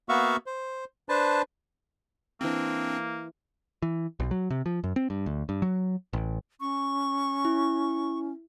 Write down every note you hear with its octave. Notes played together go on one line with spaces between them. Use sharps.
A#3 B3 F#4 E5 F5 C#6
C5
D4 B4 C5 A5
E3 A#3 C4 D4 C5 D#5
E3
B1
F#3
C3
F3
F#2
C4
G2
D2
G2
F#3
A1
C#4 C#6
E4